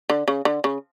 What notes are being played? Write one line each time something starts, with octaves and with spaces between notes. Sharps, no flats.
D3
C#3
D3
C#3